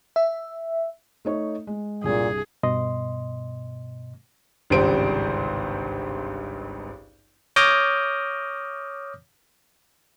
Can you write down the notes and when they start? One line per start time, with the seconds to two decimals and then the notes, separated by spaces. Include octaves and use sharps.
0.16 E5
1.25 A3 D#4 C#5
1.67 G#3
2.04 C2 G2 A#2 G#4
2.63 G2 B2 D#5 C6
4.70 G#1 C#2 G2 C3 C5 D7
7.56 C#5 D6 D#6 F6 G6 A#6